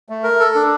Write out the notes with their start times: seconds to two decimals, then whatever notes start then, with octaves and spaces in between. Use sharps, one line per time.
0.09 A3
0.24 A#4
0.40 A4
0.55 D4